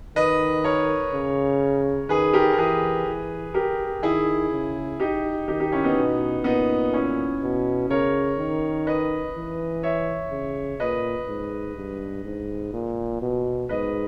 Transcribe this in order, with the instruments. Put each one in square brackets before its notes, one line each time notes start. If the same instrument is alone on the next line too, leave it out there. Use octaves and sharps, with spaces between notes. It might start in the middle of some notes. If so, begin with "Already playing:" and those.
[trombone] D#3 [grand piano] B4 D#5
[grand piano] A#4 C#5
[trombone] C#3
[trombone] D#3 [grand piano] G#4 B4
[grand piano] G4 A#4
A#4
[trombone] E3 [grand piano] G#4 B4
[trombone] E3
[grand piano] G4 A#4
[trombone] D#3 [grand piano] E4 G#4
[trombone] C#3
[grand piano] D#4 G4
[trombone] D#3 [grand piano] D#4 G4
[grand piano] D#4 G4
C#4 E4
B3 D#4
[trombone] B2
[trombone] A#2 [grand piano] B3 D#4
[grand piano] C#4 E4
[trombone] B2
[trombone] C#3 [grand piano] A#4 C#5
[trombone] D#3
[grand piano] B4 D#5
[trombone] E3
[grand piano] C#5 E5
[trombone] C#3
[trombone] A#2 [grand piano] B4 D#5
[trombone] G#2
G2
G#2
A#2
B2
[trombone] G#2 [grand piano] B4 D#5